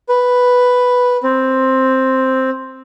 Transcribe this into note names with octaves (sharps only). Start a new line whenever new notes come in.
B4
C4